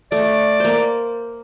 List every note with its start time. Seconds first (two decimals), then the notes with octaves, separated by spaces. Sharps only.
0.12 A3 D5
0.60 A#3 C5